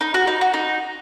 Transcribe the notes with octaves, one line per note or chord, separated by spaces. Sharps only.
D#4
F#4
D#4
F#4
D#4